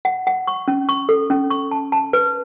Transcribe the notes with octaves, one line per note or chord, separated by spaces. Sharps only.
F#5
F#5
C#6
C#4
C#6
A4
C#4
C#6
A5
A5
B4